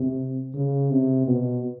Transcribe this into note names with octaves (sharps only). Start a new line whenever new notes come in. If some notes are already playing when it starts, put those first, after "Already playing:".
Already playing: C3
C#3
C3
B2